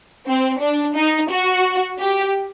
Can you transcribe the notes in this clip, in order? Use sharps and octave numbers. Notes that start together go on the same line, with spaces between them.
C4
D4
D#4
F#4
G4